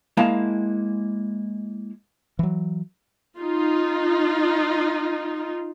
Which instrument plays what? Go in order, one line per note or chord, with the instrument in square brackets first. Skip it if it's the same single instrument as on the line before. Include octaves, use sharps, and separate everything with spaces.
[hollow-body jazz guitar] G#3 A#3 E4 F5 A5
[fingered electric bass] E3 F#3
[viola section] D#4 F4